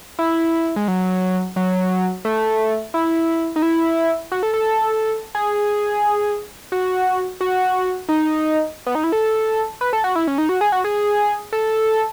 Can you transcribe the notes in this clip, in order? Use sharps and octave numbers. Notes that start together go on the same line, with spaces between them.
E4
G#3
F#3
F#3
A3
E4
D#4
E4
F#4
A4
A4
G#4
F#4
F#4
D#4
B3
D#4
E4
A4
B4
A4
F#4
E4
C#4
D#4
F#4
G#4
F#4
G#4
A4